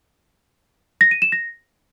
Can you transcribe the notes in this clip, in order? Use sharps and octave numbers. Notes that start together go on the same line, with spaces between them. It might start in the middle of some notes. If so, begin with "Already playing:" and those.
A#6
D#7
E7
A#6